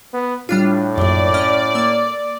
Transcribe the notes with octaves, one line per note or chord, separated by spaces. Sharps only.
B3
A2 G3 D4 F4
A#1 F#2 D5
C#4 D#5 F6
A#3 E6